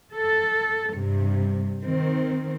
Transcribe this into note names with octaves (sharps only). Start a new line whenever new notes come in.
A4
G2 C3
D#3 C4